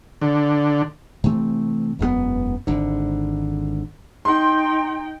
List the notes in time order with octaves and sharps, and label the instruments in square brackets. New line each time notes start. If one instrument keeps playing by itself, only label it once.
[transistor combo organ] D3
[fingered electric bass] C3 E3 A3 C4
E1 F#2 F3 B3
G#1 D3
[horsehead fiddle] D#4 G5 [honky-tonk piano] C6